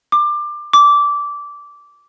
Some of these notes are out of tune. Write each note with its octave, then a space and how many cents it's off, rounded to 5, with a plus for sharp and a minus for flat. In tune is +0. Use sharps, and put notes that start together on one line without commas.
D6 +20
D6 -15